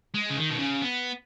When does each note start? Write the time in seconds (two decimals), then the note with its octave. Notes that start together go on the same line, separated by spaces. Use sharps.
0.14 G#3
0.30 C#3
0.37 D#3
0.50 B2
0.59 C#3
0.82 B3